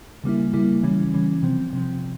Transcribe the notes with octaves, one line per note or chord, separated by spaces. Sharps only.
C#3 G3 A#3 E4
C#3 G3 A#3 E4
C#3 E3 G3 C#4
C#3 E3 G3 C#4
C3 F3 C4
C3 F3 C4